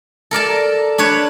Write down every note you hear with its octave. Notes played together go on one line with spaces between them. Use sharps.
A4 A#4 D5 A5
D4 B4 C#5